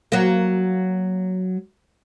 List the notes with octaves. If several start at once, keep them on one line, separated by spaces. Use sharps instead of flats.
F#3 A#3